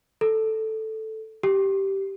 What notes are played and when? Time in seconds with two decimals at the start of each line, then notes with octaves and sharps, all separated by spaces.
0.21 A4
1.43 G4